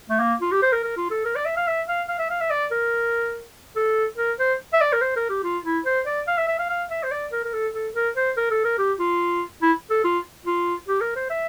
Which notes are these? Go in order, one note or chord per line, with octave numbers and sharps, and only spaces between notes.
A3
A#3
F4
G4
C5
A#4
A#4
F4
A4
A#4
D5
E5
F5
E5
F5
F5
E5
F5
E5
D5
A#4
A4
A#4
C5
E5
D5
A#4
C5
A#4
G4
F4
E4
C5
D5
F5
E5
E5
F5
F5
E5
C5
D5
A#4
A#4
A4
A4
A#4
C5
A#4
A4
A#4
G4
F4
E4
A4
F4
F4
G4
A#4
C5
E5